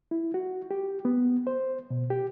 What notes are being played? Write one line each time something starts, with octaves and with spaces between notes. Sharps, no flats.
E4
F#4
G4
B3
C5
B2
G4